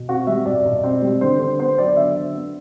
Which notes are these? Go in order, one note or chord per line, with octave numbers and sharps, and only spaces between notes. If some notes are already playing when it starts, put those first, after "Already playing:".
Already playing: B2
C4 F#4
G3 E5
B2 D5
B2
C4
G3
D3 C5
D3 C5
B3 C5
F#3 D5
D3 E5
D3
B3